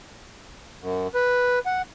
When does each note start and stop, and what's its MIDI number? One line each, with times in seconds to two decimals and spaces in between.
0.82 1.07 42
1.15 1.59 71
1.66 1.82 78